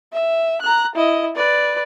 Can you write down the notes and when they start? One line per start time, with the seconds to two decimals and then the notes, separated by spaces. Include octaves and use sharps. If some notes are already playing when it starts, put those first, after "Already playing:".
0.12 E5
0.62 A#5 F#6
0.95 E4 D#5
1.36 B4 D5